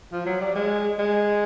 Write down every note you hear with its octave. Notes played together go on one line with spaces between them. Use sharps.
F3
F#3
G3
G#3
G#3